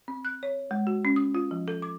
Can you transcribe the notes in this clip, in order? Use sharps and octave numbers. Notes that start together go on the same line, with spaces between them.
C4
F#6
C#5
G#3
F#4
C#4
D#6
F4
F3
A4
D6